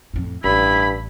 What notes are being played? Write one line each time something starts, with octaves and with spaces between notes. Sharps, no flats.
F2 A2
A1 G2 E4 B5